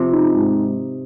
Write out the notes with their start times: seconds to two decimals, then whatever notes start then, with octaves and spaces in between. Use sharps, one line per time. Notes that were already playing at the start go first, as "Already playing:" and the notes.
Already playing: C3 F3
0.13 D#4
0.33 G#2